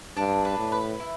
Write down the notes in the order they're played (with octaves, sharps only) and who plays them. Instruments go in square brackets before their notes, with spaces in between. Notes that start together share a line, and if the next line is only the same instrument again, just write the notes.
[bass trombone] G2 [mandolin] D4
[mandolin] B4
[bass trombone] A2
[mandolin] B4
E4